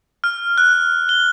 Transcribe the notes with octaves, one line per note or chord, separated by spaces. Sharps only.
F6
F#6
G7